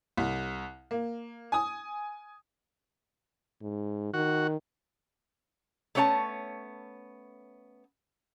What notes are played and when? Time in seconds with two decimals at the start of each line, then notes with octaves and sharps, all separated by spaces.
0.17 C2
0.91 A#3
1.52 G#5 D#6
3.62 G#2
4.14 D#3 F#4
5.95 A3 B3 C#4 C#5 F#5 A5